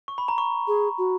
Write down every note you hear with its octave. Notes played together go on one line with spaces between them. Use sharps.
C#6
B5
A#5
C#6
G#4
F#4